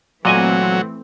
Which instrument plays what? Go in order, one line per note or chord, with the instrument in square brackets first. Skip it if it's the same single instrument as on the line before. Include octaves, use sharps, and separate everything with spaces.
[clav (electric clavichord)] A#2 D#5 G#5 [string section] E3 A3 C4 [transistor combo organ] F#3